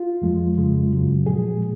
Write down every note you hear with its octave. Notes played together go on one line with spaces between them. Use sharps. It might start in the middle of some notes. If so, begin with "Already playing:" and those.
Already playing: F4
F2 F3 G#3
F2 C#3 G#3
F#2 C#3 F#3
A#2 F3 G#3 G#4